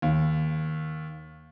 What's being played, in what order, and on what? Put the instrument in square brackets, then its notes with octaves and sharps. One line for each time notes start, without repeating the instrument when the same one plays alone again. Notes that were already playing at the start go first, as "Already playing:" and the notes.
[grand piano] D#2